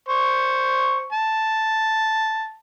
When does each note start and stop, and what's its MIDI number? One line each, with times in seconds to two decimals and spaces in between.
0.09 1.07 72
0.09 1.07 85
1.12 2.56 81